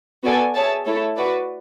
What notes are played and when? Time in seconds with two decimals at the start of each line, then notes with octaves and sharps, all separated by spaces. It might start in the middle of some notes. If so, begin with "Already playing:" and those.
0.24 B3 F#4 A4 D5 G#5
0.55 G#4 C#5 E5 A5
0.86 A3 E4 A4 C#5
1.16 F#4 B4 D5